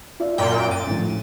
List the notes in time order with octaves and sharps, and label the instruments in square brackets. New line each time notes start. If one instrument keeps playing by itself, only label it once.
[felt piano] F4 D5 E5
[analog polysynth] F#2 A#2 G5
[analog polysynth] A6 [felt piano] D#7
[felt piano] A2 F3